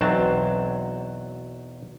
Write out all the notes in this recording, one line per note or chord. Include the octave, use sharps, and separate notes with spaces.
B1 E2 F#3 C4 A5